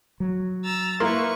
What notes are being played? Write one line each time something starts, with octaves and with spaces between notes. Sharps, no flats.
F#3
A#5 E6 A6
A#3 E4 B4 C6 C#6